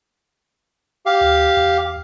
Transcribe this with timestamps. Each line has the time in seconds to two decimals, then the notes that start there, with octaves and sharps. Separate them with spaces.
1.06 G4 F5
1.21 D2
1.57 E2